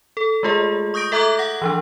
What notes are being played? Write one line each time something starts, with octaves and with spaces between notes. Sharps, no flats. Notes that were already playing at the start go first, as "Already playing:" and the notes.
A4
G#3 A3 F4 G#4 D#5
C#6 D#6 G6 A#6 D7
A4 E5 A#5 D6 F#6 G#6
F#5 A#6
E3 F3 D4